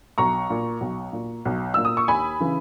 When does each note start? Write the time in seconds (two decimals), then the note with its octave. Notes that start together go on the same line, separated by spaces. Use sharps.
0.18 B1 A#5 C#6
0.50 A#2
0.81 B1
1.13 A#2
1.45 B1
1.74 A#2 E6
1.85 D#6
1.97 C#6
2.08 D#2 G#5 B5
2.41 C#3 E3